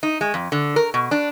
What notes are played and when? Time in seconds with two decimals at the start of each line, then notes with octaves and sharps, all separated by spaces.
0.03 D#4
0.21 G#3
0.34 F2
0.52 D3
0.76 A#4
0.94 B2
1.11 D4